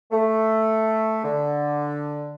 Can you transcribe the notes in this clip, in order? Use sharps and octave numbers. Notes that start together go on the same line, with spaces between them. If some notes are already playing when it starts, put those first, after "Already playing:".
A3
D3